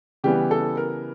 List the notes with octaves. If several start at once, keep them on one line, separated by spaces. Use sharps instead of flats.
C#3 E3 G3 B3 G4
A4
A#4